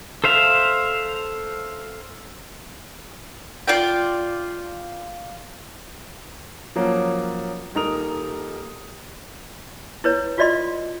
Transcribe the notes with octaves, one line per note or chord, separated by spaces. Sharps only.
A4 C5 E5 F5
F4 D5 G5
F3 F#3 A#3 C#4
D#1 D#4 A#4 D#6 F7
E4 B4 C#5
F4 F#4 D5 D#5 C6